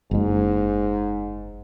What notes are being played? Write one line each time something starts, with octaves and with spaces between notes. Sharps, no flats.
F#1 G#2 G#3